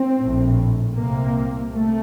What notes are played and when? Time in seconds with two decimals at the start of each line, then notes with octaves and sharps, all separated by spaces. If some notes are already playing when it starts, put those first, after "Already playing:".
Already playing: C4
0.18 A#1 A2
0.94 C2 C3 A#3
1.71 C3 A3